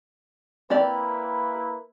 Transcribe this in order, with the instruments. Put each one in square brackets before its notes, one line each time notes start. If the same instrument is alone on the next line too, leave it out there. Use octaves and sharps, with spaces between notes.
[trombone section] A#3 E4 B4 [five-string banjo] C4 G4 D5